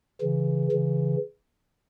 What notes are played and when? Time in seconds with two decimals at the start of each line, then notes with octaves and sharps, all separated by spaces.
0.21 C#3 E3
0.72 C#3 E3